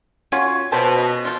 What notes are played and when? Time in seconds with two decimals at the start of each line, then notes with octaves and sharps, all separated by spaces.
0.32 C#4 F4 F#4
0.72 B2 B4 C5 A5
0.98 D#5
1.25 F3 F4